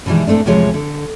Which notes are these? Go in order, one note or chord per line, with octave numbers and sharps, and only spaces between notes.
B2 D#3 E3 G3 G#3
A#2 A3 C4 D4
E2 A2 C3 F3 G#3 C#5
D3